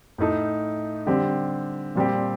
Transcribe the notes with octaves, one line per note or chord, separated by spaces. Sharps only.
A2 A3 D#4
D3 G3 C4 G4
A#2 G3 C4 G4